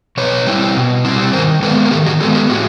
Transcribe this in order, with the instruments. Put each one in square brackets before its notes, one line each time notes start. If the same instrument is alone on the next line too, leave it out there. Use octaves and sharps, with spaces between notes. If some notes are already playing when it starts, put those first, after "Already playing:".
[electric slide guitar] B2 B4 C#5
G3 C4 E4
B2
G3 C4 E4
D#3 A#4 C5
G#3 A4 B4
B3
A#4
D#3 G4 A4
F#4 G#4
G#3 B3 G4 A4
G4 A4
A2 F#4 G#4